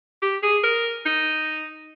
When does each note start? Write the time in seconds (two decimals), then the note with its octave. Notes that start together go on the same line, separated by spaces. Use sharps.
0.22 G4
0.43 G#4
0.63 A#4
1.06 D#4